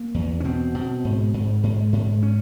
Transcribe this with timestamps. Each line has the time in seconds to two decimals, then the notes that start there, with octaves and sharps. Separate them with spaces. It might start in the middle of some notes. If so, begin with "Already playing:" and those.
Already playing: A#3
0.14 E2
0.40 C#4
0.44 B2 C4
0.75 B2
1.05 G#2
1.34 G#2
1.63 G#2
1.93 G#2
2.23 C#4